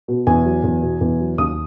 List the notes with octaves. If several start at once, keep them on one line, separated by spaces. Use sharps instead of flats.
B2
E2 G#5
F#3
E2
B2
E2
F#3
D#2 D#6